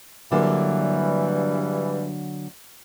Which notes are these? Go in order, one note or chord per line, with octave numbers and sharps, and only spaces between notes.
G2 D3 E3 F#3 G3 A#3